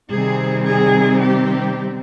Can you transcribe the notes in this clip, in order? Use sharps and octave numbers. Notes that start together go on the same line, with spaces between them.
C3 D#3 G3 C4 G#4
G#4
G4